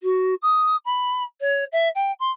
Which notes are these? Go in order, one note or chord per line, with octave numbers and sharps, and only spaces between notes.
F#4
D#6
B5
C#5
E5
G5
C6